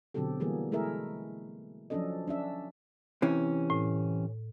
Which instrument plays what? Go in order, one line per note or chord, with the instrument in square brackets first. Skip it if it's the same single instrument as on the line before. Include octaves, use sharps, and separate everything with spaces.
[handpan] B2 D3 F#3 C4 G4 A4
E3 G3 A#3 B3 G#4
G#3 A3 E4 G#4 A#4 E5
F3 F#3 C#4 D4 A4 D#5
C#4 D4 E5
[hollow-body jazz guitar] C3 E3 C#4
[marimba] A2